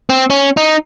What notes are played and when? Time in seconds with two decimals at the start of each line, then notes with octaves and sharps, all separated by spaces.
0.10 C4
0.30 C#4
0.57 D#4